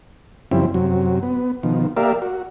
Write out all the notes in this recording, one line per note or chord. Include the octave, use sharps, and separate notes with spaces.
F#2 C#3 F3 G3 C4 E4
F#2 C3 F#3
B3
B2 D#3 F3
A#3 G4 A#4 D5 E5 F5
F#4